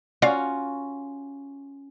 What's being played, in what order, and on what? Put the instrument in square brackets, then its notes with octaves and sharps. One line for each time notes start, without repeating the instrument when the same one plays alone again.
[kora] C#4 F4 F#4 [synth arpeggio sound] D5 F5